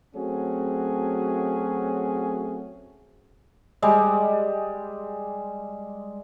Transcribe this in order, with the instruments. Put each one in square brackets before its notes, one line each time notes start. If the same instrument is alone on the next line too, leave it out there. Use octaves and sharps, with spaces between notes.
[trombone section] F#3 A3 C4 C#4 F#4 G#4
[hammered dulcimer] G3 G#3